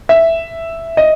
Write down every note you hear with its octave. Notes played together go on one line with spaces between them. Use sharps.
E5
D#5